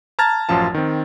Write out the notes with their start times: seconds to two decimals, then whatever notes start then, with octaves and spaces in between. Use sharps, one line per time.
0.19 A5 A#5 F6 G#6 A6
0.49 A1 F#2 F3 F4 A5
0.74 D#3 C4